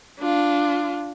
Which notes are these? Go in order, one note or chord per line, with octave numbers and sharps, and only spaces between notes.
D4 F4